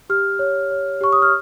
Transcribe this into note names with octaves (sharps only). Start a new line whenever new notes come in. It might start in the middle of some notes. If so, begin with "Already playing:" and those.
G4 F6
C#5
C#5
G4 C#6
D#6
F6